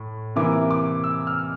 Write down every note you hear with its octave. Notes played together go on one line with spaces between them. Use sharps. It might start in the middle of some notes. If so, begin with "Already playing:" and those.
Already playing: A2
C3 E3 A#3 E4 D6
D6
E6
F6